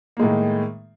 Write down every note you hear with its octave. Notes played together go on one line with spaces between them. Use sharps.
A2 D#3 G#3 A#3